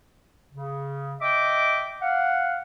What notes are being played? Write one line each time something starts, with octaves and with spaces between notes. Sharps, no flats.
C#3
D#5 E5 G5 D6
F5 F#5